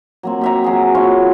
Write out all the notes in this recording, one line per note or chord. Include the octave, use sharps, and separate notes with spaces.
F#3 A#3 C4
G4 E5 A#5
F#3 G#4
E4 F4 C#5